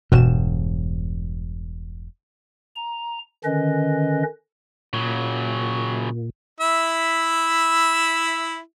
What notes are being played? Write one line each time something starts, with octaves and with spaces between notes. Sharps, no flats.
E1 G2 B2 E7
A#5
D3 D#3 C#4 B4 D#5
A#2 C#3 F#3
E4 E5